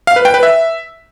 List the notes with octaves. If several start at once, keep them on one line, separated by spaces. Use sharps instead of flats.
F5
B4
G5
B4
E5